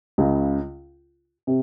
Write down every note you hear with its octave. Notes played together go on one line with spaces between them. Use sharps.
C#2 C#3
C3